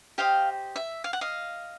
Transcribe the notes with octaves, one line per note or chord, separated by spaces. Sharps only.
G4 C5 D#5 F5 G5
E5
F5
F#5
D#5 F5